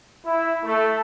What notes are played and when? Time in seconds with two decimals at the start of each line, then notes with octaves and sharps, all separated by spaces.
0.24 E4
0.64 A3